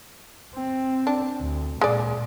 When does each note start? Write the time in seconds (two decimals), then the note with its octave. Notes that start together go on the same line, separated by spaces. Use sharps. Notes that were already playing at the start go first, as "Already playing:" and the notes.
0.55 C4
1.07 D4
1.41 D2
1.81 A#2 G#3 D5